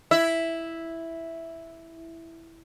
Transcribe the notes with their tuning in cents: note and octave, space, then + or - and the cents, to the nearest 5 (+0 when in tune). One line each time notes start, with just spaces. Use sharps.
E4 +0 E5 +0